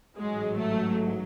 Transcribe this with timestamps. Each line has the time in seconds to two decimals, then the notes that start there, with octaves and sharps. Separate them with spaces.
0.18 A1 G#2 F#3 G#3
0.58 A3